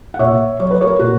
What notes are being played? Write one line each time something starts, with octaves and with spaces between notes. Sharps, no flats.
F#5
A#2 C#5 E5
F#3 C#5
B4
A#4 C#5
A#2 F#4 A#4